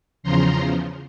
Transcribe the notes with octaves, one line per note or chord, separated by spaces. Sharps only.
E2 C#3 F3 A#5 C6